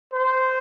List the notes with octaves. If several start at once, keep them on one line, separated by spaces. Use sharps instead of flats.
C5